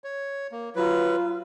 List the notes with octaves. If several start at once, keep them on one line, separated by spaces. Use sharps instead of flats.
C#5
A#3
F#3 F4 B4